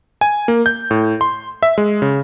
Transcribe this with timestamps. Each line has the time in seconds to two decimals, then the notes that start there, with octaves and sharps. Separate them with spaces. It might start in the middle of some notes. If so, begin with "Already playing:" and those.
0.21 G#5
0.48 A#3
0.66 G6
0.91 A2
1.21 C6
1.63 E5
1.78 G#3
2.02 C#3